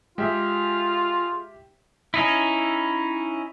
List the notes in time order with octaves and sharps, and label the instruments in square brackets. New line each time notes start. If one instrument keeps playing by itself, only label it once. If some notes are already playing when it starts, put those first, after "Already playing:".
[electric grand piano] G#3 [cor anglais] F4 [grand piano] G4 E5
[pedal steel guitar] C#4 D#4 E4